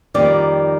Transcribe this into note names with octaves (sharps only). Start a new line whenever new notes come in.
F2 D#3 G3 A#3 D5